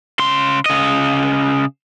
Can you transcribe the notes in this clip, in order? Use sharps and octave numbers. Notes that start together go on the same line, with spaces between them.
C#3 C6
C#3 D#5